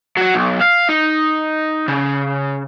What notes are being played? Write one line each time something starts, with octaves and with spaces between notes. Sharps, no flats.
F#3 F#4
B1
F5
D#4
C#3